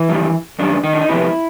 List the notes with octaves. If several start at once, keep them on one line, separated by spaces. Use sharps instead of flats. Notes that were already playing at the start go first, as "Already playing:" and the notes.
Already playing: E3 E4
F#2 D#3 G3
F#2 D#3 G3 D4
D#3 D#4
D4
D#4
F2 C3 E3 G3 B3 E4